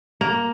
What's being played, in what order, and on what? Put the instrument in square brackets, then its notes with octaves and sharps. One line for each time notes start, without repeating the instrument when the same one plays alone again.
[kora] A#3